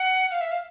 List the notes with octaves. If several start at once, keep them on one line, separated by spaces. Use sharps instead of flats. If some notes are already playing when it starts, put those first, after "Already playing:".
Already playing: F#5
F5
E5
F5